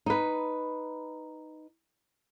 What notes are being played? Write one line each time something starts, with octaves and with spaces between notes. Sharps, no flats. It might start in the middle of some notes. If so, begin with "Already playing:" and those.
D#4 B4